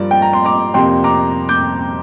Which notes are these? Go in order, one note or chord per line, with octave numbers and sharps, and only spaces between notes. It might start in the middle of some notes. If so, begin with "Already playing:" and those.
Already playing: G2 F3 A#3 D5
G5
A#5
C6
A#5 D6
F2 C3 A#3 G5 C6
A#5 D6
D6 G6